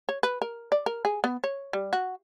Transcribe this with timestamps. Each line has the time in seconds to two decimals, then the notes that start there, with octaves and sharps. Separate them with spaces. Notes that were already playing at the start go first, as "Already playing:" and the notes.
0.09 C#5
0.23 B4
0.42 A#4
0.72 D5
0.86 A#4
1.05 G#4
1.24 B3
1.44 C#5
1.73 G3
1.93 F#4